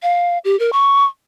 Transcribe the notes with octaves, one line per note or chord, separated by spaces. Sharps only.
F5
G4
A#4
C#6